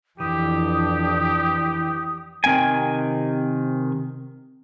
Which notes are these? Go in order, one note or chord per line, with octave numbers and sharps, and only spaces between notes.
F2 E3 D4 G4 D#6
C3 D#3 C4 G5 G#5